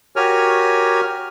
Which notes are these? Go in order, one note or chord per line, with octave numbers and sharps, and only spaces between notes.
F#4 G4 A#4 C#5 G#5 F6